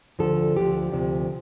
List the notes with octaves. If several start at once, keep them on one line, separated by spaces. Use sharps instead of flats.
D2 D3 F3 A4
D2 D3 F3 G4
D2 C3 F3